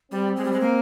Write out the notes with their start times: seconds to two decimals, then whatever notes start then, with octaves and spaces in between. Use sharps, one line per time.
0.11 G3 C4
0.36 G#3
0.45 G3
0.52 G#3
0.61 A#3